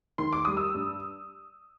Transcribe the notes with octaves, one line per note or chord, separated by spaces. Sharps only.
D#3 C6
D6
G3 D#6
E6
G2